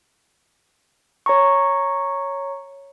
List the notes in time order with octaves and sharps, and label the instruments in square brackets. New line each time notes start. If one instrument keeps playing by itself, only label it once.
[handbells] C#5 A#5 C#6